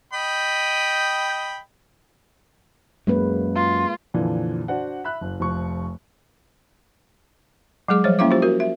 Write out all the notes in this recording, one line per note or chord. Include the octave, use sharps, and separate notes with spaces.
D#5 G5 B5
F#2 G#3 A#3 B4
F4
F2 A#2 D3 E3 F3
D4 F#4 C5 D5 F#5
E5 B5 F#6
F#1
F1 F3 C#6
F#3 G#3 G#4 D6
F3 G3 C5 C#5
A#3 C#4 E4 E5 F5 D6
F4 G4 C5
F#4 A#4
E5